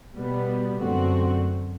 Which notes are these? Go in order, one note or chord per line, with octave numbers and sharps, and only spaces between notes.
B2 G3 B3
F#2 D3 A3 C4 F#4